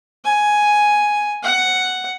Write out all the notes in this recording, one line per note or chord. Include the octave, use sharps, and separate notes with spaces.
G#5
F#5